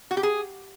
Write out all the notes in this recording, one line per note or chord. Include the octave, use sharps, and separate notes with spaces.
F#4
G4
G#4